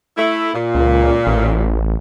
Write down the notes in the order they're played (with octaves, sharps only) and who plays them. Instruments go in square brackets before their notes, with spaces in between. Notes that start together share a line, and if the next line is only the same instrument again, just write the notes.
[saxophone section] A3 E4
A#2
[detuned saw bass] C#2
A1